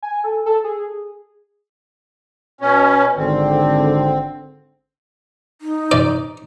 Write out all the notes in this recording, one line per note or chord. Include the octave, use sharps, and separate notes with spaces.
G#5
A4
A4
G#4
B2 C#4
G#1 D3 C4
D#4
D5